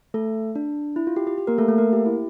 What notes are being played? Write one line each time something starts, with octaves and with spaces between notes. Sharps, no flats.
A3 A4
D4
E4
F4
G4
G4
G4
A#3 A#4
A3 A4
A3 A4
A#3 A#4
G4
E4